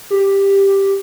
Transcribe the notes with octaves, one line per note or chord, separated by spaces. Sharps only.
G4